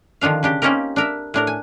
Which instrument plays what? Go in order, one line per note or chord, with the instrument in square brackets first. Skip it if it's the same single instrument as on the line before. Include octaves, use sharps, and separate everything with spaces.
[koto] D3 D#3 F3 D4 F5
C#3 D4 G4
A#3 C4 C#4 D#4 G4 A#4
D4 A#4 E5
A2 D4 A#4
G#5